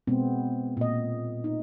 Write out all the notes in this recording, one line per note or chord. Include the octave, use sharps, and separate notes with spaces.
B2 G#3 B3 C4
A#2 D#5
D#4